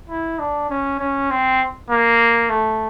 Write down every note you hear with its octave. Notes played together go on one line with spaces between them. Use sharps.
E4
D4
C#4
C#4
C4
A#3
A3